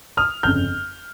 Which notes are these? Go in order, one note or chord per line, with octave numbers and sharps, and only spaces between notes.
D#6 F6
G1 F2 C#3 F6 G6